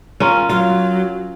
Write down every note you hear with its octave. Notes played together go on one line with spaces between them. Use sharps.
C#4 F4 A#4
F#3 F4